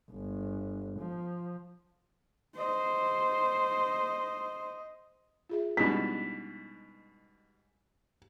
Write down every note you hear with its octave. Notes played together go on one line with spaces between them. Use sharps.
G1
F3
C5 D#5
F4 G#4 E5
G#2 B2 G3 C#4 D4 E4 B6